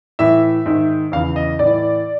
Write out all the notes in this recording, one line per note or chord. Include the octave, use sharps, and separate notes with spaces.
A2 E3 E5
G#2 D#3
E2 C#3 E3 F5
D#5
A2 E3 D5